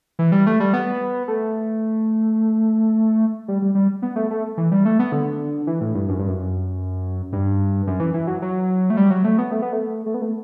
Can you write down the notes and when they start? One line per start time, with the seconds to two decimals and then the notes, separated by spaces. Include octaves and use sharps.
0.19 E3
0.32 G3
0.47 A3
0.60 G3
0.74 B3
1.28 A3
3.48 G3
3.62 G3
3.75 G3
4.02 B3
4.16 A3
4.31 A3
4.57 E3
4.72 G3
4.85 A3
4.99 B3
5.12 D3
5.67 E3
5.81 A2
5.94 G2
6.08 F#2
6.19 G2
6.28 F#2
7.33 G2
7.87 F#2
8.00 E3
8.14 E3
8.27 F#3
8.42 F#3
8.90 A3
8.97 G3
9.10 F#3
9.24 A3
9.38 B3
9.51 A3
9.62 B3
9.73 A3
10.06 A3
10.14 B3
10.22 A3